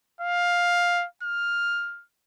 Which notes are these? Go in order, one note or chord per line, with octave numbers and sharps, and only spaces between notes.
F5
F6